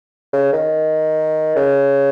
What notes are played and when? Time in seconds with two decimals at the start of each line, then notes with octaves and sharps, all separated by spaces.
0.33 C#3
0.53 D#3
1.56 C#3